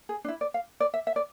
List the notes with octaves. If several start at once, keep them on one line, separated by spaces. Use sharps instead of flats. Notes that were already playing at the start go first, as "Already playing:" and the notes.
G#4
D4
E4
D5
F5
D5
E5
E5
D5